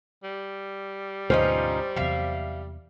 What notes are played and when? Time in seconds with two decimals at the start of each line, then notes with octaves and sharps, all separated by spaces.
0.23 G3
1.30 D2 G#2 B2 F3 C#4 D#4 C5
1.96 E2 C3 F#3 E5 F5